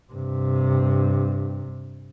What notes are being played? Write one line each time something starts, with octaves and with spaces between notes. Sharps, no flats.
G2 C3